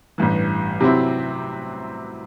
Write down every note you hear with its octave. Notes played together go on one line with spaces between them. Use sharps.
A1 G2 E3
C3 F#3 C4 E4